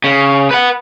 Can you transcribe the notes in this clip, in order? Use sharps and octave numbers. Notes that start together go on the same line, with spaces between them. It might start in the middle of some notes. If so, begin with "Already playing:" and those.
C#3
B4 F#5